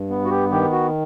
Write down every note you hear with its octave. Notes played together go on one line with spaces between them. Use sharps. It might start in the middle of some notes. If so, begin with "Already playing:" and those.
Already playing: G2
B3
F#4
G4
D#3 G4
F#4